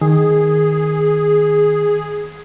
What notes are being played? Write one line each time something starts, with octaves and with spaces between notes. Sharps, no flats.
D#3 G#4